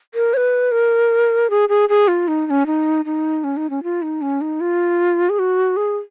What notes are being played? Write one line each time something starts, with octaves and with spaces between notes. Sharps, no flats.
A#4
C#5
B4
A#4
G#4
G#4
G#4
F4
D#4
D#4
C#4
D#4
D#4
C#4
D#4
C#4
F4
D#4
C#4
D#4
F4
G#4
F#4
G#4